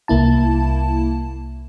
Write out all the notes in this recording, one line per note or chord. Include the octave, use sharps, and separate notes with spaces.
C2 A#3 E4 A5